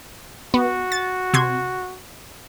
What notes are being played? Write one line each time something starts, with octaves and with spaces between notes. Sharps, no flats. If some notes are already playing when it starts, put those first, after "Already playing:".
B3 F#4
A6
C3 C6 G#6